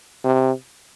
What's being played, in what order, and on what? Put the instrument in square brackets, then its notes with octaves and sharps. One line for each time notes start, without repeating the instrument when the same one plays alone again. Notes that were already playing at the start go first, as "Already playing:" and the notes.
[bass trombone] C3